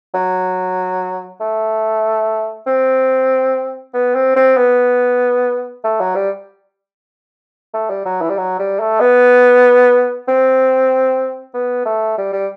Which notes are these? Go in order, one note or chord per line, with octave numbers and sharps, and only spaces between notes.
F#3
A3
C4
B3
C4
C4
B3
A3
F#3
G3
A3
G3
F#3
E3
G3
F#3
G3
A3
B3
C4
B3
A3
G3
G3